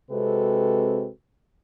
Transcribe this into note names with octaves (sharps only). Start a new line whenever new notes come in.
C3 G#3 C4 F#4 A4 B4